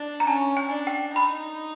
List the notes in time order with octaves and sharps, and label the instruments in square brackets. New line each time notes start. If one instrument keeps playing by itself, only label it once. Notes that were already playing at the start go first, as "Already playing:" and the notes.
Already playing: [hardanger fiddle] D4
[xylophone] A#5
[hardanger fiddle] C#4 [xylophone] A5
[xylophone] G#5
[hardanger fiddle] D4
[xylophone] G5
[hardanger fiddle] D#4 [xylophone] B5